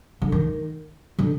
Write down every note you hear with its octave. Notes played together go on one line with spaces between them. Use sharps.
D3
D#3
D3